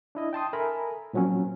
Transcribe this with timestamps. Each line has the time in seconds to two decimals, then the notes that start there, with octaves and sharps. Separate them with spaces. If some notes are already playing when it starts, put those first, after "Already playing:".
0.15 D4 E4 D#5
0.33 G5 A5 C6 D#6
0.53 A4 A#4 E5 G#5 A#5 B5
1.13 A#2 F3 F#3 C4 C#4